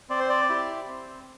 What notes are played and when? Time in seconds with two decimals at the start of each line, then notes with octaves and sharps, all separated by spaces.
0.10 C4 D5
0.20 C5
0.29 D5
0.49 E4 G4
0.88 C4